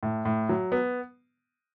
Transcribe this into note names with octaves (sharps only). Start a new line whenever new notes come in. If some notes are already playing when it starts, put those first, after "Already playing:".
A2
A2
F#3
B3